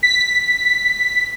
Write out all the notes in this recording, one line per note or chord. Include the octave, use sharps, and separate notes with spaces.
B6